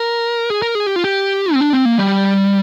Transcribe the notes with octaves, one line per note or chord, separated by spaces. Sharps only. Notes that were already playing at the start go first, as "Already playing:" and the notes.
Already playing: A#4
G#4
A#4
G#4
G4
F4
G4
C4
D4
C4
A#3
G3